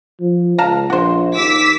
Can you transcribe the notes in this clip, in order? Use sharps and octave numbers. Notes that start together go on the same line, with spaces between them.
F3
C#2 F5 A5 A#5
A#1 F#4 C5
D#2 D6 E6 B6